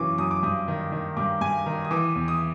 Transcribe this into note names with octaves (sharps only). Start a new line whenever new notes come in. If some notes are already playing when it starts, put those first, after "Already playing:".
Already playing: F#2 C#3 E3 C#6 D6
F#2 D#6
D6
G2 D#6
D#3
D#3
G2 D6
G2 G#5
D#3 A#5
D#6
E3 D6
E2
D#6